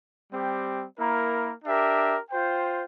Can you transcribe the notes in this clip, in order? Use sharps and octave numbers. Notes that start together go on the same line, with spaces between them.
G3 C4 G4
A#3 E4 A#4
D4 G4 A#4 E5
F4 C5 G5